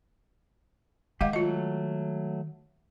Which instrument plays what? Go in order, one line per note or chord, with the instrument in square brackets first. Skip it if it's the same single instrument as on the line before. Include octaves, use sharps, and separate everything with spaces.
[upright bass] D#3 G#3 [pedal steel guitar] G4 [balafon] D#5 F5 F#5
[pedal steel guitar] F#3 A3 [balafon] F4 D#5